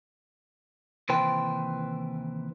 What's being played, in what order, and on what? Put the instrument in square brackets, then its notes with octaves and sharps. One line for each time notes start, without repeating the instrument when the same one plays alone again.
[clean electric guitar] D#2 C3 E3 B4 C5 G5